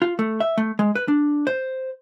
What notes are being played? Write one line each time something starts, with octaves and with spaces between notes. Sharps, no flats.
F4
A3
E5
A3
G#3
B4
D4
C5